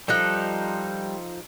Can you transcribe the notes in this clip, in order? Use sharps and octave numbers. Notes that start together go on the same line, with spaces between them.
F3 G3 D#4 A4 F#6